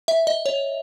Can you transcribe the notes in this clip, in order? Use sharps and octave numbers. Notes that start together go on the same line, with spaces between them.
E5
D#5
C#5